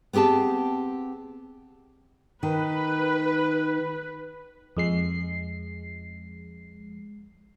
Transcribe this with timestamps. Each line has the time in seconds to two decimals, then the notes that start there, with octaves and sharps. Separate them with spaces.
0.13 B3 C4 G4 G#4 A5
2.43 D#3 B4
4.77 F2 G#3 C7